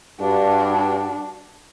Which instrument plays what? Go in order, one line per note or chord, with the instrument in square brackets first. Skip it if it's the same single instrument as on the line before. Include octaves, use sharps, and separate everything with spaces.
[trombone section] G2 [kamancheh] D4 F#4